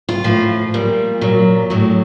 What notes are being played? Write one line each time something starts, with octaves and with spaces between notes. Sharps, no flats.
F4
A2 F3
A#2 G3
A#2 F#3
A2 F#3